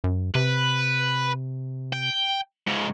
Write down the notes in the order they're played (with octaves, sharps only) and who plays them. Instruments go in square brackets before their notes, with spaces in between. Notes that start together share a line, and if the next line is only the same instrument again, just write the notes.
[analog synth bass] F#2
[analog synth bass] C3 [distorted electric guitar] B4
[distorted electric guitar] G5
G#2 C#3